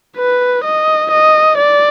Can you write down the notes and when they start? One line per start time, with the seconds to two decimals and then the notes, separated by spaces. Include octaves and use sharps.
0.17 B4
0.64 D#5
1.11 D#5
1.57 D5